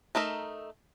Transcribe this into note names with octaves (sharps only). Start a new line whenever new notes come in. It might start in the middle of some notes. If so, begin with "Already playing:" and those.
A3 D#4 A#4 E5